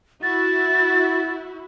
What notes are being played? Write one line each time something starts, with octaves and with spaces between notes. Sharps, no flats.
E4 F#4 A6